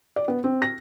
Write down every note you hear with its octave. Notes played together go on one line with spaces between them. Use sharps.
D5
B3
C4
A#6